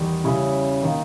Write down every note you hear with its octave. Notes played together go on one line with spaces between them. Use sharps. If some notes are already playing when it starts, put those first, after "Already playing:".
Already playing: E2 D#3 G3
C#3 G3 C#4 E4
D#3 A#3